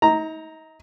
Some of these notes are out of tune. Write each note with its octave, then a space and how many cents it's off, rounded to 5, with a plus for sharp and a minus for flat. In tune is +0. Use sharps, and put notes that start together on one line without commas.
D#4 +35 A#5 +0